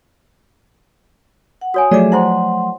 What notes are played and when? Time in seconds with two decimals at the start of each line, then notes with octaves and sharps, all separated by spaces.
1.61 F#5
1.74 F#4 C#5 G#5 D#6
1.91 F3 F#3 A3 G#4 C#5 D5 E5 D6
2.12 D#4 E4 C5 F#5 C6